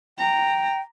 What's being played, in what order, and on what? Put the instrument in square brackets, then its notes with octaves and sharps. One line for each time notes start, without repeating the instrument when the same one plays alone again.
[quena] G5 [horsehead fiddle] A#5